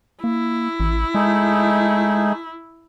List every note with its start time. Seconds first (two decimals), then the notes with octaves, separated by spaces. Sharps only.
0.24 A#3 E4
0.80 A1
1.15 G#3 A3 D#4 G#4